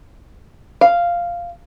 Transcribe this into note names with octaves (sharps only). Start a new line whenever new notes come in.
F5